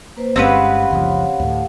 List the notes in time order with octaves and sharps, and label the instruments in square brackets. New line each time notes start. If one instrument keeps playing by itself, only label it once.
[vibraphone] A#3 B4 C5
[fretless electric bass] G1 G#3 [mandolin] C4 C#4 B4 [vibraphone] G4 F5 F#5
[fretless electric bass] F#1 C#2 F3
D2 A2